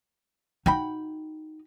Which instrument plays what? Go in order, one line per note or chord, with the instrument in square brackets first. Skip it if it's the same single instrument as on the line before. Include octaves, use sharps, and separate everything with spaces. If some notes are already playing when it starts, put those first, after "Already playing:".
[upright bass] D#4 [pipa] F#4 G5 B5